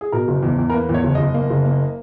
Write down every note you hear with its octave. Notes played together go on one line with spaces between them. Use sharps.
G#4
B2 A#4
F#1
E2
E2
A#4
A#3 B4
E2
C#5
F#1
F#1 D#5
A#3
F#1
A#3